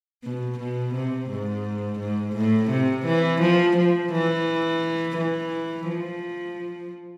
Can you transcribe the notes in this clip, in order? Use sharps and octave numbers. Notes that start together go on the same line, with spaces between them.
B2
B2
C3
G#2
G#2
A2
C3
E3
F3
F3
E3
E3
F3